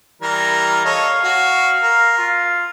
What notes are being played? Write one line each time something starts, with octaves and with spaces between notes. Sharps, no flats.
E3 G3 A#4
A4 C#5 D#5 F5
F#4 C#6
A#4
F4